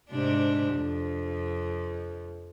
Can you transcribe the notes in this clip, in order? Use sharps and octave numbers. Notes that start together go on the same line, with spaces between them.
G#2 C3 D4
F2